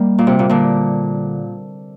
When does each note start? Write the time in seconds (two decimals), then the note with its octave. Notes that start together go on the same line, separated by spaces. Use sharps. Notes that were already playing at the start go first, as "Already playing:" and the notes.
Already playing: G3 A#3
0.18 A#2
0.27 C3
0.39 A#2
0.49 A#2 D3